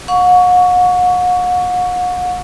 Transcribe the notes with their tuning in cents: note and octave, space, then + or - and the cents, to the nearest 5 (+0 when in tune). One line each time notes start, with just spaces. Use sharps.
F#5 -40 C#6 +25